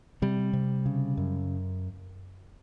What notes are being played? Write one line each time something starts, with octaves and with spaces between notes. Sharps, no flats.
C3 G3
C3
C#3
F#2